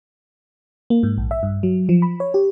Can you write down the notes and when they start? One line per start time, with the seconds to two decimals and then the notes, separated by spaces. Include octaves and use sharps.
0.90 A#3
1.03 G#2
1.18 A#1
1.31 E5
1.43 G2
1.63 F#3
1.89 F3
2.02 B5
2.20 C#5
2.34 G4